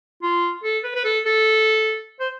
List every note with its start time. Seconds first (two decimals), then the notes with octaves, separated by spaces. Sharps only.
0.23 F4
0.64 A4
0.84 B4
0.95 B4
1.05 A4
1.25 A4
2.20 C5